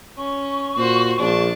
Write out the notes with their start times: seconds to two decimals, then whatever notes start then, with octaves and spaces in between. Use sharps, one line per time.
0.17 C#4 C#6
0.77 A#2 F#4 C5
1.19 A#1 D4 A5